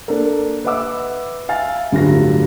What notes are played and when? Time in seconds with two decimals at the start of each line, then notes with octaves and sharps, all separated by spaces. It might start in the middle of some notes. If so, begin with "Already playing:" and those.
0.08 A#3 D4 A4 A#4
0.64 B4 D#5 E5 F#5 D6 E6
1.49 E5 F5 G#5 A6
1.91 D1 G2 D3 F#3 F4 A#6